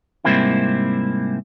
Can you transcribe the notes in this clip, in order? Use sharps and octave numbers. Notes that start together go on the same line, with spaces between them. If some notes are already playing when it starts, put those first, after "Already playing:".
G#2 C3 G3 A#3 C4 E4